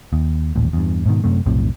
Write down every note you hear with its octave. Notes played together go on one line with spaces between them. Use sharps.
D#2
D#1 A1 D#2
E2 G2
G#2 B2 D#3
F#2 C3 A3
B1 F2 A2 C3